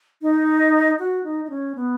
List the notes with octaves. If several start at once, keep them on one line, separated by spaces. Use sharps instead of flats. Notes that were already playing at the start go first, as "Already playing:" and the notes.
D#4
F#4
D#4
D#4
C#4
B3